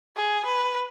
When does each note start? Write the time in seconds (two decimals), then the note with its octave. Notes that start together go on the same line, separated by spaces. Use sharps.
0.16 G#4
0.45 B4